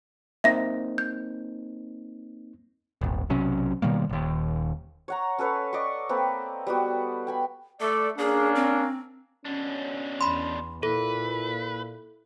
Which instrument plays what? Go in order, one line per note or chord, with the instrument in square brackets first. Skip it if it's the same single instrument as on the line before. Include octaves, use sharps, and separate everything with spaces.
[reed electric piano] A#3 C4 D#4 [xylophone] E5 A#6
[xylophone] G6
[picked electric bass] D#1 G#1
B1 C3 F#3 C#4
B2 D#3 G3 A#3
D#1 D#2
[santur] C#5 F#5 A#5
C#4 A4 B4 C#5
D5 D#5 C6 C#6
A#3 C4 A4 B4
G3 B3 F#4
G5 G#5 B5
[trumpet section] A3 D5 [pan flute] A4
[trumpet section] A#3 C#4 D4 [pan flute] G#4
[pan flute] C4
[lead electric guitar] B2 D4 [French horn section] C#4
[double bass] E2 [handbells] B5 C6
[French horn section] A#2 [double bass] E4 [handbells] A4 [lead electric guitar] B4